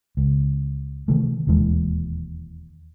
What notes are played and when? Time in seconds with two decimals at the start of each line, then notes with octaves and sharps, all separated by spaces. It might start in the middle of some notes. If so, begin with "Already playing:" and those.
0.17 C#2
1.08 C3 D#3 E3 A3
1.47 E1 D#2 E3 G#3